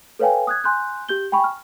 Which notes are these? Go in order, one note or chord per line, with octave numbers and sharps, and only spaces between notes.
A4 B4 C#5 F5 G5 G#5
D#6 F#6 G#6
G#5 C6 F#6 G6
G4 G6 G7
G5 G#5 B5 C#6
F6